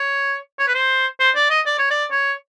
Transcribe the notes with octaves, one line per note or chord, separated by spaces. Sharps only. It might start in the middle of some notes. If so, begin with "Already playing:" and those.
Already playing: C#5
C#5
B4
C5
C5
D5
D#5
D5
C#5
D5
C#5